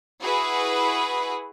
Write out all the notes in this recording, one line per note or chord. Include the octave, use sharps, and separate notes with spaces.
E4 F#4 G#4 B4